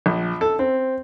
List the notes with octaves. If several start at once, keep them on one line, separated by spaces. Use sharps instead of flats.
A#1
A4
C4